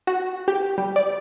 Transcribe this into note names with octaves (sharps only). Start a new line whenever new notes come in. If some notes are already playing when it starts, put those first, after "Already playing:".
F#4
G4
G3
D5